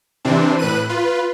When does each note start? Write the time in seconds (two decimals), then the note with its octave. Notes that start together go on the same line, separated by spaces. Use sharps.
0.25 C3 E3 C4 D4
0.59 A2 B4 F#6 D#7
0.89 F4 B4